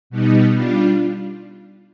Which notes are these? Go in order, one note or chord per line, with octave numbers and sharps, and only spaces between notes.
B2 G3 B3 D#4
G3 D4 F4